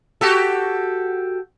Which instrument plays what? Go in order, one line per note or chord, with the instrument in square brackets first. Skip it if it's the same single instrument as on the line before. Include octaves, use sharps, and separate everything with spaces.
[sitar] F#4 G4 A4